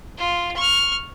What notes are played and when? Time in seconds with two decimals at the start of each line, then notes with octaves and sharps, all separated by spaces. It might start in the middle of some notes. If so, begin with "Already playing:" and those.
0.18 F4
0.56 C#6 F6